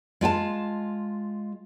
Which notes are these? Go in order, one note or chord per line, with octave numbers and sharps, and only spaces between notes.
G#3 F4 G5 A5